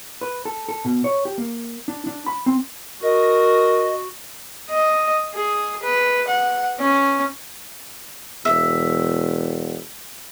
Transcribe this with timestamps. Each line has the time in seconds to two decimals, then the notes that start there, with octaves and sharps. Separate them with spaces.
0.21 B4
0.45 A4
0.69 A4
0.85 B2
1.04 C#5
1.25 G4
1.38 A#3
1.88 D4
2.07 D4
2.26 B5
2.46 C4
3.03 F#4 A#4 D#5
4.70 D#5
5.35 G#4
5.83 B4
6.27 F#5
6.79 C#4
8.45 E1 E5